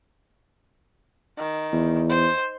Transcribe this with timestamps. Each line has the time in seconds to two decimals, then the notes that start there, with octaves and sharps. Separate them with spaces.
1.38 D#3
1.72 E2
2.10 C5